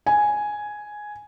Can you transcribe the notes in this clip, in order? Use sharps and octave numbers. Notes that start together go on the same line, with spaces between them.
G#5